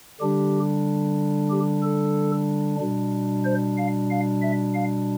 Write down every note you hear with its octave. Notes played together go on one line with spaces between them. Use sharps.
D3 G3 D4 G4
G4
A4
B2 G3 D4
C5
F5
F5
E5
F5